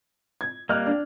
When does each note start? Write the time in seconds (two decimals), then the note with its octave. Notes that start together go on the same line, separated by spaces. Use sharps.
0.41 G#6
0.69 G3 A#3 D#5 F6 F#6
0.86 D4